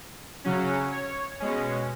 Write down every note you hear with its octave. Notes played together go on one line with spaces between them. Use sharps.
C#3 F#3 C#4
C#5
B2 G#3 C#4